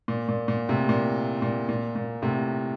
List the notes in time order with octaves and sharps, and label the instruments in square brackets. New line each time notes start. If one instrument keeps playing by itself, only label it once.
[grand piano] A#2
A#2
A#2
A2 C3
A#2
A#2
A#2
A#2
A2 C3